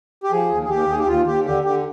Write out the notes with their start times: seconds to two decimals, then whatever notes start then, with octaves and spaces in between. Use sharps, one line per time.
0.24 G4
0.32 F3 G#4
0.51 D#2
0.64 G#4
0.69 D#2 G4
0.88 D#2 G#4
1.00 G4
1.08 D#2 F4
1.27 D#2 G4
1.45 D3 G4
1.65 D3 G4